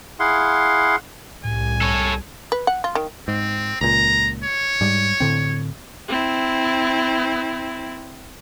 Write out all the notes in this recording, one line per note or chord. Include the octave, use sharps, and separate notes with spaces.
E4 G#4 F5 F#5 C6
C2 A2 G#5
A4 C#5
B4
F#5
F4
D#3
G#2 C4
C#2 A#2 A#5
C#5
G#2 G3
A2 D3 C4
C4 E4